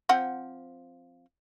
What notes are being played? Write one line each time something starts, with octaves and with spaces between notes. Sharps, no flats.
F3 C4 F#5